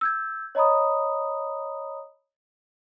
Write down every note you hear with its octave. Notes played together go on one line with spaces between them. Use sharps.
E6 G6 G#6
C#5 D#5 A#5 B5 D#6